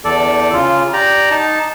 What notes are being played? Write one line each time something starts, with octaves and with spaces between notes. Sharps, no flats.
E2 A4 D5
C#3 F4
G4 D5 A#5
D#4 A5